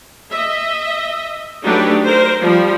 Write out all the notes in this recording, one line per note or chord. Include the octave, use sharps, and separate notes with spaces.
D#5 E5
F#3 A3 D4 D#4 G4 B4
A#4 C5
F3 G3